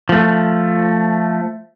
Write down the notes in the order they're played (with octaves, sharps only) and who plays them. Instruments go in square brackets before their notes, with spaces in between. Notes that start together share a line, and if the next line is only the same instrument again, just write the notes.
[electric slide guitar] F3 A3